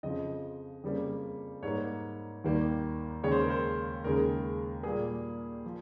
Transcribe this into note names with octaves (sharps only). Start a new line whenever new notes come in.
F2 C#3 F3 D#5
F2 C#3 G3 A#3
G#2 G3 A#3 C#5
D#2 D#3 G3 A#3
D#2 C#3 G#3 C#5
C5
A#4
C5
D#2 C#3 G#3 A#4
A#2 G3 A#3 G#4
F3